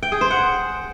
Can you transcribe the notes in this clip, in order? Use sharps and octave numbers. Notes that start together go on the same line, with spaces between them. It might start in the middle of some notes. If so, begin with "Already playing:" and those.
G5
G#4
C5
F#5